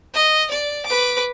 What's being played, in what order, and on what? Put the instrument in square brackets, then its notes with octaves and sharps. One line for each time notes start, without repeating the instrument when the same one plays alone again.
[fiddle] D#5
D5
B4 D6